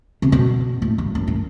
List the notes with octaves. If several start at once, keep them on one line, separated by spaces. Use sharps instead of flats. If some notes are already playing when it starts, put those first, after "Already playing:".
C3
B2
A2
G2
F#2
A2